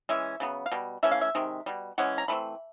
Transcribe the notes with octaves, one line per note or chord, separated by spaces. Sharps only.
E3 G#3 C#4 E5
C#3 F#3 B3
F5
B2 G3
E3 A3 C#4 E5
F5
E5
C3 D#3 G#3
B2 G3
E3 G#3 C#4 F#5
A#5
E3 A3 C4 B5